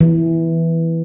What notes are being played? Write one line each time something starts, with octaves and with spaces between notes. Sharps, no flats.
E3